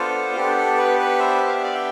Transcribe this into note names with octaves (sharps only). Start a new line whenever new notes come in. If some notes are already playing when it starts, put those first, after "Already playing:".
Already playing: B3 D4 F4 A4 C5
B3 D4 G4 A4
A4
B4
B4
C5 E5
F5
E5
D5 F5
E5 G5